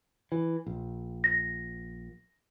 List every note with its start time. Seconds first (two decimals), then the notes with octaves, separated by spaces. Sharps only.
0.32 E3
0.66 A#1
1.24 A#6